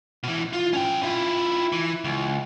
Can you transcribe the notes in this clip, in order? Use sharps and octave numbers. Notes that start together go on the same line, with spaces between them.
B2 E3
F4
C#4 G5
E4 F4
E3
C#2